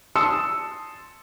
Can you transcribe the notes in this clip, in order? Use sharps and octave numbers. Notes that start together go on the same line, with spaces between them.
A5 C6 D#6 E6 C#7 E7